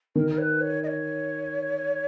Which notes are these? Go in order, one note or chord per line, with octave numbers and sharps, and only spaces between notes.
D#3 A#4
A#4
C#5
B4
C#5
D#5
C#5